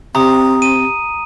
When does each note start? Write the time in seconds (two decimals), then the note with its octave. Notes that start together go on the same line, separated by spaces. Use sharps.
0.15 C3 C4 A#5 D#6
0.62 D#7